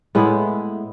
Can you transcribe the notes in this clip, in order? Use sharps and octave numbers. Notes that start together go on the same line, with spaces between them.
A2 G#3 B3 E4